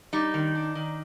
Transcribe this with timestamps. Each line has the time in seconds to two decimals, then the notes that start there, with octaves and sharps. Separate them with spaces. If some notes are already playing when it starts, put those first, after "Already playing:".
0.13 G3 D#4
0.34 D#3
0.55 D4
0.75 D#3